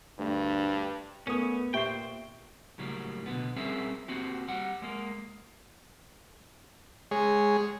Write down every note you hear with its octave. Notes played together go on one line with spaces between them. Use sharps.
D2 G2
E2 A3 B3 C#4 A#4 B4 D#6
A#2 G4 C5 E5 G5 C#6
A2 C#3 F#3 G3 A#3
B2 D3 B3
G3 C4 C#4 G#4 A#4 E5
A#3 C4 F#4 G4
G3 F#5
G#3 A#3
G#3 G#4 C#5